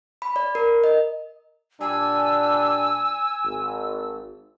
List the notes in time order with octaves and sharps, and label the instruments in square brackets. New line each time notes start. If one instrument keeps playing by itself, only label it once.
[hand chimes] B5
D5
A#4
D#5
[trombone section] A#2 G3 D4 [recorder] G#5 [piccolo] E6
[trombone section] G#1